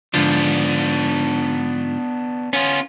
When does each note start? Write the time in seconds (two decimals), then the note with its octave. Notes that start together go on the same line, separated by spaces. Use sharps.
0.14 G#2 D3 F3 B3 D4
2.53 B3 C#4 F4